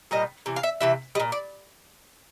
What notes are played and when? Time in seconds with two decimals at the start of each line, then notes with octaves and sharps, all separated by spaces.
0.11 A#2 G3 D#5
0.46 C3 E3
0.56 F5
0.63 E5
0.80 C3 E3 E5
1.15 G3 D#5
1.20 A#2
1.32 D5